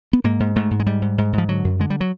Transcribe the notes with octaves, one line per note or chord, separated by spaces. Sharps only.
B3
G#2 A#3
G#2
G#2 A3
G#2
G#3
G#2 G3
G#2
G#2
G#2
F3
D3 F#3
F#2
D3 G#3
G3
F#3